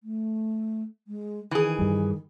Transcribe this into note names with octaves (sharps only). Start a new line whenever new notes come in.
A3
G#3
D#3 E3 G#4
G2 G3